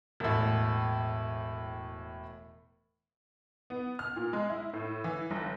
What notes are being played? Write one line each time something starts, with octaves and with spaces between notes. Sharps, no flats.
E1 A2
B3
F6
A#2
G#3
E4
A2
E3
G1